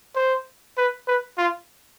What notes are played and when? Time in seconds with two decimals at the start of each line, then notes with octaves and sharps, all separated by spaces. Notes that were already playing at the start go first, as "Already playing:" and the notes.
0.16 C5
0.78 B4
1.08 B4
1.38 F4